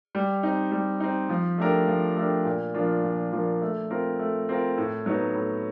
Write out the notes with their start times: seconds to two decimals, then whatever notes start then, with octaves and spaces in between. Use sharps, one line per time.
0.15 G3
0.43 C4 D#4
0.72 G3
1.00 C4 D#4
1.29 F3
1.58 A3 D4 G4 A#4
1.88 F3
2.16 A3 D4 G4 A#4
2.45 A#2
2.74 F3 A#3 D4 F4
3.04 A#2
3.32 F3 A#3 D4 F4
3.62 A3
3.90 C4 F4 A#4
4.19 A3
4.49 C4 F4 A#4
4.78 A2
5.06 F#3 B3 D#4
5.35 A2